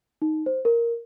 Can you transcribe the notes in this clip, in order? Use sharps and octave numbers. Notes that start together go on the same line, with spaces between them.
D#4
C5
A#4